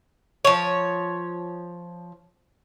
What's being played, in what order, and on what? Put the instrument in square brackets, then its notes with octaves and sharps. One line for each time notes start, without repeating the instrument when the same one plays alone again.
[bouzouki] F3 C#5